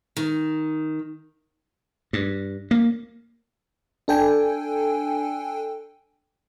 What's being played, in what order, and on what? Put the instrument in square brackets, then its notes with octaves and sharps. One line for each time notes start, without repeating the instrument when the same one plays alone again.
[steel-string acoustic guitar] D#3
[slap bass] G2
A#3
[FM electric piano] D4 A4 G5 G#5